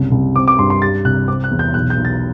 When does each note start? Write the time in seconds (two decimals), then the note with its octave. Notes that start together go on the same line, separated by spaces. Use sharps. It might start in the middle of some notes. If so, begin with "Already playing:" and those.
Already playing: F#1 C2
0.12 C2
0.36 C4 D6
0.48 D6
0.59 G2 C6
0.70 C6
0.82 G3 A6
1.05 C2 F#6
1.28 C4 D6
1.44 F#6
1.51 E2
1.59 G6
1.74 B1 F#6
1.90 G6
1.97 B1
2.05 A6